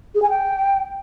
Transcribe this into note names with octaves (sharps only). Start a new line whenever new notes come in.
G#4
G#5
G5